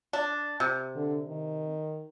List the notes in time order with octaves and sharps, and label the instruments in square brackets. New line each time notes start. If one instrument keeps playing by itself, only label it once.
[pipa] D4
C3
[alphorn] D3
D#3